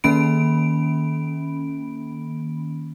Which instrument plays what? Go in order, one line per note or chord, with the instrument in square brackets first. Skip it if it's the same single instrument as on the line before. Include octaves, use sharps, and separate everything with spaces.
[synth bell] D#3 A#3 C#4 B5 D7